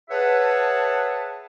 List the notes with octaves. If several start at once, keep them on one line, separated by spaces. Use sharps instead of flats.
G#4 B4 C#5 E5 F#5 A5